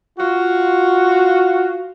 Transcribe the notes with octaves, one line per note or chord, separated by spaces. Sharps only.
F4 F#4